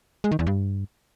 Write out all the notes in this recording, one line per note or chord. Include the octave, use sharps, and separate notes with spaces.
G#3
D#3
E2
G2